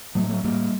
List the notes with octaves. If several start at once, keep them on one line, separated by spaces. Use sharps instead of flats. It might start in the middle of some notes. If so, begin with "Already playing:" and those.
A2 F#3 A3
F#3 A3
A2 G3 A#3